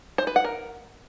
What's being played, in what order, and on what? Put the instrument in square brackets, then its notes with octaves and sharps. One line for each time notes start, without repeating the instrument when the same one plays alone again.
[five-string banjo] C5
B4
F#5
A#4